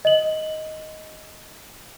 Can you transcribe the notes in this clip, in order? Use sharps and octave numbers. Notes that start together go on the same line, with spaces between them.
D#5 F#7